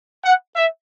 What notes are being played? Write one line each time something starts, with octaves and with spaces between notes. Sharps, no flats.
F#5
E5